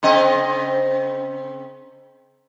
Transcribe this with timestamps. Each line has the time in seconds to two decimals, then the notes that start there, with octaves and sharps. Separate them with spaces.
0.03 C#3 C4 D#5